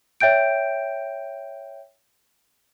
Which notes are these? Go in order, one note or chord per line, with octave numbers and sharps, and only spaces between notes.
C#5 E5 G5 G6 D7